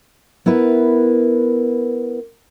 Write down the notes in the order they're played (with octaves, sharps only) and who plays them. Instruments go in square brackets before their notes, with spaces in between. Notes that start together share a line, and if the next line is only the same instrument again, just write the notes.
[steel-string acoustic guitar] B3 E4 A#4 B4